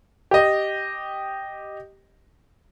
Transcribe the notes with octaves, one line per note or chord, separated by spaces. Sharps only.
G4 D#5